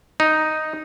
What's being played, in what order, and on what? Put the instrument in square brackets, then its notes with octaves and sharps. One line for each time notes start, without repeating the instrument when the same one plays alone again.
[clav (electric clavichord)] D#4